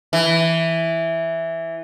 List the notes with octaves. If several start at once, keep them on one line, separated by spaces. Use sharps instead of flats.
E3